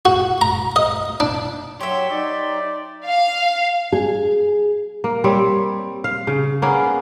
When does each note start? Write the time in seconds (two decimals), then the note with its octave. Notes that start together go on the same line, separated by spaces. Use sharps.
0.05 F#4
0.41 A#5
0.76 D#5
1.20 D4
1.81 F#3 G4 C#5 E5 C6
2.11 D#4 D5
3.04 F5
3.92 G#4
5.04 A#3
5.24 G3 C4 C#5
6.04 F5
6.27 C#3
6.62 A#3 B3 C#4 G#4